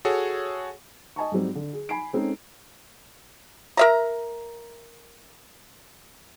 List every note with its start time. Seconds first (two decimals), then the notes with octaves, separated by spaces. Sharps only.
0.05 F#4 G#4 A4 C#5
1.16 D#5 G#5 A5 C#6
1.32 G#2 F#3 G3 C4
1.55 D3
1.73 G#4
1.89 G#5 B5 C7 D7
2.13 G#3 C4 C#4 D#4 G#4 A4
3.77 A#4 E5 A#5